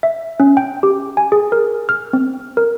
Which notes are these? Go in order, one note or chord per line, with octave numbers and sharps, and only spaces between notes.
E5
C#4
G5
G4
G#5
G#4
A#4
F6
C4
A#4